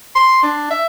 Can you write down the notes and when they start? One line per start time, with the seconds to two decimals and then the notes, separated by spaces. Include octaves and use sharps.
0.15 C6
0.43 D4
0.71 E5